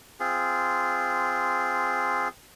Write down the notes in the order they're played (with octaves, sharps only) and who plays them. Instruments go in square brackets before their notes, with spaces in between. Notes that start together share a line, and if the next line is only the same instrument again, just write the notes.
[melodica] C4 F4 G#4